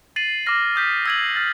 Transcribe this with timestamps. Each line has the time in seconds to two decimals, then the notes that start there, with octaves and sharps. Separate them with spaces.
0.16 A6 C7 D#7 F#7
0.46 D6 F6 A#6
0.76 D#6 G6 B6
1.06 E6 G#6 C7 D#7 F#7
1.36 F6 A6